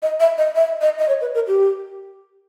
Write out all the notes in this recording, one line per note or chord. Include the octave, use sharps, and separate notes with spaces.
D#5
E5
D#5
E5
D#5
D#5
C#5
B4
A#4
G4